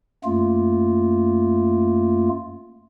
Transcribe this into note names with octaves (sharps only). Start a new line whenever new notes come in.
F#2 A3 A#3 F4